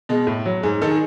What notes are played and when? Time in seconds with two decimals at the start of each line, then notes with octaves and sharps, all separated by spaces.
0.09 B2 G#3
0.27 A2
0.46 F#3
0.63 G#2 G#4
0.82 D#3 G#3 A4
0.91 G#4